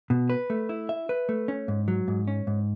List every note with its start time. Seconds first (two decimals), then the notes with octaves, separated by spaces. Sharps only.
0.10 B2
0.30 B4
0.50 A3
0.69 E4
0.89 E5
1.09 B4
1.29 A3
1.48 C#4
1.68 G#2
1.88 F#3
2.08 G#2
2.28 C#4
2.47 G#2